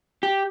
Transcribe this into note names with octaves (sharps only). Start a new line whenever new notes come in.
G4